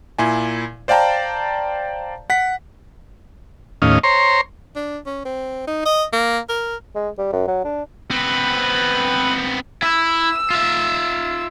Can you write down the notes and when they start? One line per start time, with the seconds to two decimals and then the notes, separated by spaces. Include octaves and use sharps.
0.18 A#2 E4 G#5
0.88 C5 D5 F5 G5 A5 A#5
2.30 F#5 B6
3.82 D#2 A2 C#4 D#5 F5
4.04 C5 C#5 A#5 C6
4.76 D4
5.06 C#4
5.25 C4
5.67 D#4
5.85 D#5
6.13 A#3
6.49 A#4
6.95 G#3
7.19 G3
7.33 F#2
7.48 F#3
7.64 D4
8.11 B3 C4 B4 B5
9.82 E4 E6
10.50 F4 E5